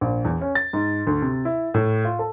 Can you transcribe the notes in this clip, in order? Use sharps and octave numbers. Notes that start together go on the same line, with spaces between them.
A#1
E2
C#4
A6
G#2
D2
C3
E4
A2
F4
A4